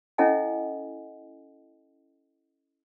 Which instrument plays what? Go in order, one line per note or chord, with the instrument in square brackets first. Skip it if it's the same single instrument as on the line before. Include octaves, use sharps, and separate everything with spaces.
[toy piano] C#4 E4 A4 D#5 F#5 G#5